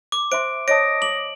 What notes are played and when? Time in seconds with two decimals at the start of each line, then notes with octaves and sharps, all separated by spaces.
0.12 D6
0.32 C5 E5 C6 D7
0.68 C#5 D#5 A5 D#6 A#6 D7
1.02 D6 F#7